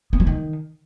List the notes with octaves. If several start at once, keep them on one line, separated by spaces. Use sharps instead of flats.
B3
F3
D#3